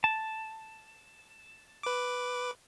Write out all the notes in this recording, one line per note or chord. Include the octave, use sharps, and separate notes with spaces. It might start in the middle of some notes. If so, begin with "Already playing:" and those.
A5
B4 D6